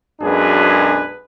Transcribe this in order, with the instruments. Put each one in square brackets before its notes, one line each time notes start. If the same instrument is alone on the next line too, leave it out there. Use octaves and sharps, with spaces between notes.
[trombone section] B1 F#2 G#3 D4 G#4 B4